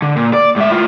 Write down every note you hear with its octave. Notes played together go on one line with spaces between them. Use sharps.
D3
A#2
D5
G#2 E5
A2 F4